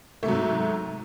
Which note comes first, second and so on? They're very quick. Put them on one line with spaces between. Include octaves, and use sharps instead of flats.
A3 C3 F#3 G#2